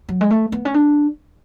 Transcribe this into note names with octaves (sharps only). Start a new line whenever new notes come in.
F#3
G#3
A3
B3
C#4
D4